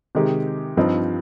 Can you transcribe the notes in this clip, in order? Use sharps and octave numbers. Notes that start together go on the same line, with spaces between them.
C3 D#3 G#3 D#4 G4
G2 F3 C4 D#4